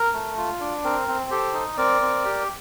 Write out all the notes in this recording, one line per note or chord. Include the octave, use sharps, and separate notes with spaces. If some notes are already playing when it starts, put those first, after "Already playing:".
Already playing: A#4
A3
F4
D4
C4 A#4
C4
G4 A4 C5
D#4
C4 A#4 D5
C4
G4